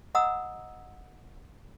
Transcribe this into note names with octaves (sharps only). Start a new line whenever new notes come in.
D#5 F#5 A#5 D#6 E6